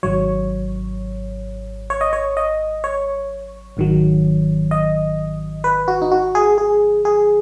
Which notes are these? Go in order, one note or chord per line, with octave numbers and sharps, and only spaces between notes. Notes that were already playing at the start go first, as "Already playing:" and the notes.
G#1 G#2 F#3 C#5
C#5
D#5
C#5
D#5
C#5
G#1 G#2 D#3 F#3
D#5
B4
F#4
D#4
F#4
G#4
G#4
G#4